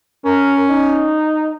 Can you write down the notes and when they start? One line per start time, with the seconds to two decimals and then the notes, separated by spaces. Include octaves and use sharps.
0.25 C#4 A#4
0.69 D#4